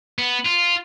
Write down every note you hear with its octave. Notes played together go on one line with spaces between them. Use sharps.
B3
F4